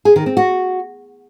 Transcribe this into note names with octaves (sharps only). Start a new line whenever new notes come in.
G#4
D#3
C4
F#4